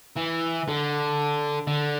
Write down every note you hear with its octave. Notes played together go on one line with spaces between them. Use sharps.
E3
D3
D3